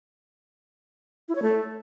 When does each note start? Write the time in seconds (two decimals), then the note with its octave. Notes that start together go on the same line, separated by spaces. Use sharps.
1.29 E4
1.35 C#5
1.42 A3